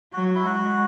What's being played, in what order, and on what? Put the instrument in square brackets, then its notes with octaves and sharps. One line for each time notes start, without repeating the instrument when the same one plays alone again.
[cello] F#3 [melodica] F#4
[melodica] E4
[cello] G#3 [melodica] F#4